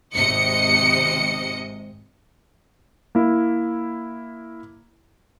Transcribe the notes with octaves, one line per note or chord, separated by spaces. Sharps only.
G#1 C3 D#5 C#7
A#3 E4